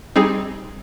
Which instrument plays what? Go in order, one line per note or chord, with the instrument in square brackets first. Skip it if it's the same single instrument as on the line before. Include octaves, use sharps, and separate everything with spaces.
[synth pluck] G3 C4 D#4 G#4